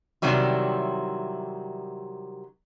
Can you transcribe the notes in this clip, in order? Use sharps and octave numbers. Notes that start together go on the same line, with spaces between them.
C3 D#3 F#3 G3 E4